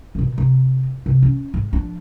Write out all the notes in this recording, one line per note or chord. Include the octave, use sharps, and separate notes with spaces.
B2 D#3
C3 D#4
C3 E3
C#4
G#2
F3 D4